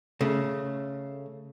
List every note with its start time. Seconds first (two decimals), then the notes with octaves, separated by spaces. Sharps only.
0.21 C#3 A3